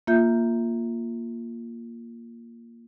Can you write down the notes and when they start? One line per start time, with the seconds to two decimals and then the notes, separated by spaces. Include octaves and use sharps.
0.07 A#3 F4 E5 G6